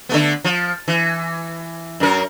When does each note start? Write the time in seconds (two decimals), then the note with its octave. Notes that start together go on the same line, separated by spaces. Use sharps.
0.09 D3 A3 B3
0.44 F3
0.88 E3
2.00 F#2 A#4